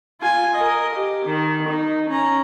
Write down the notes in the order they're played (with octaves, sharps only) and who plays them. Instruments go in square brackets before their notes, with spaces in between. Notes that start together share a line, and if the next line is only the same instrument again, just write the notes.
[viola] F4 G#5
A#4 D#5
G4
D#3
D#4
C#4 A#5